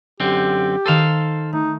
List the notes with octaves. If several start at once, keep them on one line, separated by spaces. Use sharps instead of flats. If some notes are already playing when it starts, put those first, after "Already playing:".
F#2 D3 C4 G4
D#3 A4 C5 F5 D#7
A3 D#4